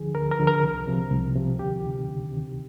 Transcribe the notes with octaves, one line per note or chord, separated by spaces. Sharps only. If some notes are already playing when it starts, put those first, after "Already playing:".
Already playing: D2 D3 F3 G#4
D2 A#4
A#4
D3 F3
A#4
C2
C3 F3
C2
C3 F3
D2 G4
C3 D#3
D2
C3 D#3